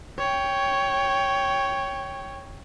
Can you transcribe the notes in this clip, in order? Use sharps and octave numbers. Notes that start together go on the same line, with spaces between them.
C#5 G5